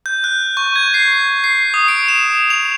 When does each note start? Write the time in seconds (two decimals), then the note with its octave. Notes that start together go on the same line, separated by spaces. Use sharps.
0.06 G6
0.24 F#6
0.57 C#6
0.76 G#6
0.94 C7
1.44 C7
1.74 D#6
1.88 D7
2.08 E7
2.50 F7